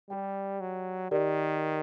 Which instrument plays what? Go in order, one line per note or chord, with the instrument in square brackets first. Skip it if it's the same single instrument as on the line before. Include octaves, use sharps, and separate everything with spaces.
[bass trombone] G3 [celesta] G4 D5 G5
[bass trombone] F#3
[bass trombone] D#3 [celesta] G4 A#4 D5